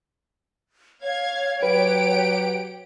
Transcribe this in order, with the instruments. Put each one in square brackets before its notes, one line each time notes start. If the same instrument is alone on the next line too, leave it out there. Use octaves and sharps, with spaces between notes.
[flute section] C#5 [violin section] F5 G#6
[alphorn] F#3 [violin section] G4 F#5 D7 [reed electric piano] B4